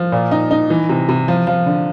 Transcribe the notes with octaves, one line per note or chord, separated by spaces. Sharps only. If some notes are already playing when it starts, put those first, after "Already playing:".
Already playing: F3
A#2
D#4
D#4
E3
C3
C3
F3
F3
D3